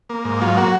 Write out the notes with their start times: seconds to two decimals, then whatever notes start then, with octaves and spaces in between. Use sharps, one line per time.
0.10 A#3
0.25 G#2
0.41 F#3 F4
0.57 A#3 F#4